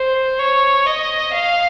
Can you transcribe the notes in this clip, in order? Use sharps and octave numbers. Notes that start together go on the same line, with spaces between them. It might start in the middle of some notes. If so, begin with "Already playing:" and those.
Already playing: C5
C#5
D#5
F5